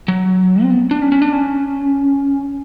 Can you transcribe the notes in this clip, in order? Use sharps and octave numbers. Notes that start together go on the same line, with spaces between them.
F#3
C4
B3
D4
C#4
C#4
D4
C#4